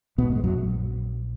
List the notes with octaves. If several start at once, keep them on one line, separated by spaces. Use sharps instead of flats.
A#1 G#2 B2 B3
A#3
G#2 G#3
F#2 F#3